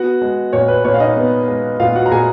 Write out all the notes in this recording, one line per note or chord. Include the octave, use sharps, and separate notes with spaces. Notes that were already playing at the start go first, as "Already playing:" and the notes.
Already playing: B3 F#4 F#5
G#3
A#2 C#5
B4
A#2 C#5
F5
D#4 D#5
B3
G#3
A#2 F4 F5
F#4 F#5
A#5
A#2 G#4 G#5